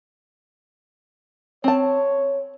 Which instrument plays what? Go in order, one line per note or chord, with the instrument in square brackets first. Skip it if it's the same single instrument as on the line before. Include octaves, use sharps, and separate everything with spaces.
[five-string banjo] C4 A5 [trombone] C#5